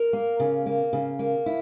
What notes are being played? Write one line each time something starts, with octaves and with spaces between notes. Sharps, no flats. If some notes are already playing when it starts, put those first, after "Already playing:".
Already playing: A#4
A#3
C#3
A#3
C#3
A#3
E4